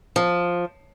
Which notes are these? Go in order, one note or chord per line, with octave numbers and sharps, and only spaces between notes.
F3